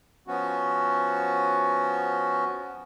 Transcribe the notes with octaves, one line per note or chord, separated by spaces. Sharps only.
F3 B3 C#4 F#4